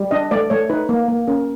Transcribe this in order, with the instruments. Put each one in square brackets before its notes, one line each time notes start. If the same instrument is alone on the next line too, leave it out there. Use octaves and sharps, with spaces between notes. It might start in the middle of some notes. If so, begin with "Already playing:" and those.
Already playing: [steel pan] G3
D4 D#5
A3 D5
A3 C#5
D#4 B4
A#3
A#3
C#4 A#4